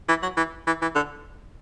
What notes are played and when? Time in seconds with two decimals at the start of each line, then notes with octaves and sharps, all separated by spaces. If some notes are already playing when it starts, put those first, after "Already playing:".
0.09 E3
0.23 F#3
0.37 E3
0.67 E3
0.82 E3
0.95 D3